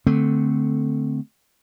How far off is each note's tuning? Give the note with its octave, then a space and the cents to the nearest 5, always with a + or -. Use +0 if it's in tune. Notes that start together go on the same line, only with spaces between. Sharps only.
D3 +0 A3 +0 C4 -15